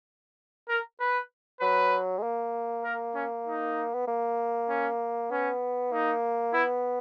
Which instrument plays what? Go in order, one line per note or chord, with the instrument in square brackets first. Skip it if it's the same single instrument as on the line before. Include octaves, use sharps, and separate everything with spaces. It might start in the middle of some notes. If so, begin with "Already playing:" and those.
[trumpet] A#4
B4
[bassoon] F#3 [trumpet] B4
[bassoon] G#3
A#3
[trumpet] A#4
C#4
D#4
[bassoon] B3
A#3
[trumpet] C#4
[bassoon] B3 [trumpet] C#4
[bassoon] A#3 [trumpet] D#4
[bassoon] B3 [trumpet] E4